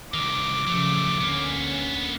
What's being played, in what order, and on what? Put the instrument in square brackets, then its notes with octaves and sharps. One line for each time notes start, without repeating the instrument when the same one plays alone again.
[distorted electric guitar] C2 D#3 [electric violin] D6
[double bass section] C#3 F3 [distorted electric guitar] F#3 A3
[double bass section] D2 D3 C#4 [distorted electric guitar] A#3 B3